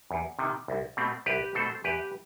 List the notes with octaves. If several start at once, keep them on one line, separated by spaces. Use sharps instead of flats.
E2
C3 D#3
C2
B2 A3 C4
C2 G4 B4
B2 A3 C4 A4 C5
E2 G4 B4